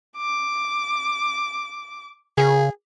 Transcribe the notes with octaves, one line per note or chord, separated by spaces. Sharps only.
D6
C#3 G#4